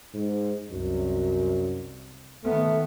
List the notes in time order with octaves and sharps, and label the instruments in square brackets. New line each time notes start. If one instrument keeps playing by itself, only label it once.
[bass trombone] G#2
[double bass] C2 [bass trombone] F#2
[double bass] D#3 B3 [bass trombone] A3